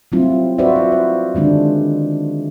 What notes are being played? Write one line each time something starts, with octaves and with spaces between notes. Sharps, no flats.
F#3 G3 A3 C4 E4 F4
F4 F#4 B4 C5 D5 E5
E4
C5
D3 D#3 G#3 D4